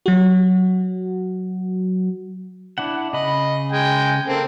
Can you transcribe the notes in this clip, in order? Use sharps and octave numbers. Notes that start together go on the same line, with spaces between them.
F#3 F#4
D4 E4 F#5
C#3 D#5 B5
G#3 G5 G#5
A#3 C4 A4